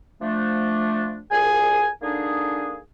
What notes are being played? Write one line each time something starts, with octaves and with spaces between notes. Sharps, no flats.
F3 A3 D4
C2 A#2 G#4 G#5
D3 A#3 D4 D#4 G#4